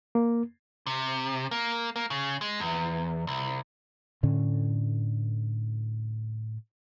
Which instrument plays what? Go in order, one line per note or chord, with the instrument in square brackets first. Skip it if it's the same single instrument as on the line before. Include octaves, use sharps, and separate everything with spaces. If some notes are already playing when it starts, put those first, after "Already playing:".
[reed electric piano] A#3
[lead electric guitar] C3
A#3
A#3
C#3
G#3
E2
C2
[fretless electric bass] A2 D3 C#4